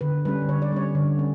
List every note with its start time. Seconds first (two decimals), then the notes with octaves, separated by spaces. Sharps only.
0.01 D3 B4
0.25 G3 C#4 B4
0.49 D3 C#5
0.62 D5
0.72 G3 C#4 C#5
0.95 D3
1.19 C#4